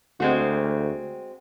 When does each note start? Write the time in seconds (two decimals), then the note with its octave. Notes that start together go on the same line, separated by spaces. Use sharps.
0.20 D2 G#3 C4 F#4